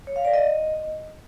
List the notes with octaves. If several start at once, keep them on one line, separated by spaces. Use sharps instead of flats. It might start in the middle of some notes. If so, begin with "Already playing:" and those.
C#5
F5
D5
D#5